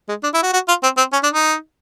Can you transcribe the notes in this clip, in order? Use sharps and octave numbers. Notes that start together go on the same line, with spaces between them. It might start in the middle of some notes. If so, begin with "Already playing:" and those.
G#3
D4
E4
F#4
F#4
F4
C4
C4
C#4
D4
D#4